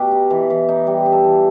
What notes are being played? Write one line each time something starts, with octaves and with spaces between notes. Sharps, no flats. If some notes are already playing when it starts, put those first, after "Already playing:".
Already playing: B2 G4
D#4
E3
E3
D#4
G3 G4
D#4
A4
E3